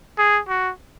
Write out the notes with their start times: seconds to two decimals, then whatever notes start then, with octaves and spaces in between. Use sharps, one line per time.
0.18 G#4
0.49 F#4